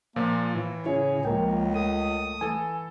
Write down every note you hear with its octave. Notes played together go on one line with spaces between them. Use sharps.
A#2 F3 A#3
A2 E3
C#3 E4 G#4 C#5
C#2 F3 A#3 A#4 G5
A3 D#6
E3 A4 G#5